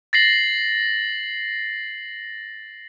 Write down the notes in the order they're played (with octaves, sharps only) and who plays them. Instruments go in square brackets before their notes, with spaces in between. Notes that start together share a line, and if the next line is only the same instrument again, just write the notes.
[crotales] A6 A#6 C7 F#7